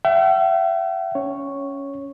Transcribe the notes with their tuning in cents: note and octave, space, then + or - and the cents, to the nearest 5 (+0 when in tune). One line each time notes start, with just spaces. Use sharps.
E5 +35 G5 -45
C#4 +10 C#5 +0